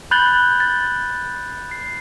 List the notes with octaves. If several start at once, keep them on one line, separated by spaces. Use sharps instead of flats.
B5 F#6 G6 A6 F#7 G7
A6
C7